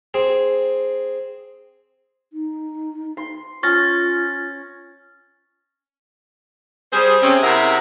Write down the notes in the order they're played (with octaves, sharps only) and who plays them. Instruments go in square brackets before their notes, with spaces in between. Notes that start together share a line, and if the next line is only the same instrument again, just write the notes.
[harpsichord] C4 G#4
[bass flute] D#4
[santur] C6
[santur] C#4 [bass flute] F4 [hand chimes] C#6 A6 A#6
[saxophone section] G3 G#4 C5
C3 C4 C#4
C3 E4 G#4 A#4 E5 F#5